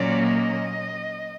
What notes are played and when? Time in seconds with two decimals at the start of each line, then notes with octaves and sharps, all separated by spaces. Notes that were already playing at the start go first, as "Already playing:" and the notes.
Already playing: A#2 F#3 A#3 C#4 D5
0.22 D#5